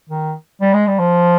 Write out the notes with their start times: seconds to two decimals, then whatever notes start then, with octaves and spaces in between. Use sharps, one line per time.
0.09 D#3
0.61 G3
0.73 G#3
0.87 G3
0.99 F3